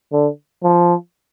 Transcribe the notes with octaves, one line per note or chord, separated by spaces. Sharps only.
D3
F3